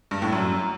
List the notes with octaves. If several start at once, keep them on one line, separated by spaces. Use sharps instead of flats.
G2
A2
F#2